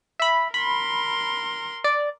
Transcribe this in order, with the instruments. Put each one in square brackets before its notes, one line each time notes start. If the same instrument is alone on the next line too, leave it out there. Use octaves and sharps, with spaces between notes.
[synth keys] E5 B5
[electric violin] A#4 C6 [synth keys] B5
[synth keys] D5